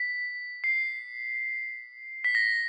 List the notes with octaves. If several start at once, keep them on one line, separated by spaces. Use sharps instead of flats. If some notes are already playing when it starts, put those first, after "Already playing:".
Already playing: B6
C7
B6
A#6